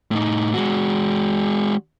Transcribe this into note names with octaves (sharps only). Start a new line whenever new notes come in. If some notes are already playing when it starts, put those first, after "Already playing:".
A2 D#4
G#3 F#4